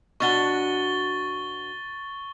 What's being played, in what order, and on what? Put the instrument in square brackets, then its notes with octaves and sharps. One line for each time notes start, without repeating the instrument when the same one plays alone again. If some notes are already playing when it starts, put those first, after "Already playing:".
[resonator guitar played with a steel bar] B2 D4 F#4 [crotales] C#6 A6 G7